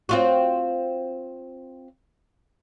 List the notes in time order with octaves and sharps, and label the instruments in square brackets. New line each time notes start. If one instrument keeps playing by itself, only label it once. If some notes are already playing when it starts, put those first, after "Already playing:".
[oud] C4 F4 F#4